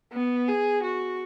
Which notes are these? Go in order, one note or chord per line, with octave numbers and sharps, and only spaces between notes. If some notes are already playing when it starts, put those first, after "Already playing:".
B3
G#4
F#4